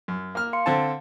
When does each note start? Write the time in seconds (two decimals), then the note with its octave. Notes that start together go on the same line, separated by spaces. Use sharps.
0.08 F#2
0.35 A#3 F6
0.53 F5 C6 C#7
0.66 D3 C4 A5